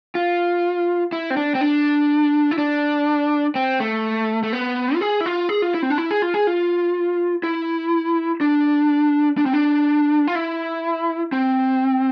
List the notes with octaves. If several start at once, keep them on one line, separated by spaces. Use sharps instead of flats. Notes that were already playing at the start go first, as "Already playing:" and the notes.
F4
E4
C4
D4
C4
D4
E4
D4
C4
A3
A3
B3
F4
G#4
E4
F4
G#4
F4
E4
C4
D4
E4
G#4
F4
G#4
F4
E4
D4
D4
C4
D4
F4
E4
C4